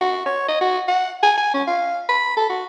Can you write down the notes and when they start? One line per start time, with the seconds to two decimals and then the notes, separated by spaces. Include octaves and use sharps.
0.01 F#4
0.26 C#5
0.48 D#5
0.61 F#4
0.88 F#5
1.23 G#5
1.37 G#5
1.54 C#4
1.68 F5
2.09 B5
2.37 A4
2.49 F#4